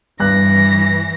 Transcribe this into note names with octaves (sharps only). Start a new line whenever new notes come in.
G2 E3 F#6 A#6